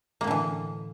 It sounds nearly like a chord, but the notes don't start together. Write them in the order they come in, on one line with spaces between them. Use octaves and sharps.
A#3 A2 D3 E3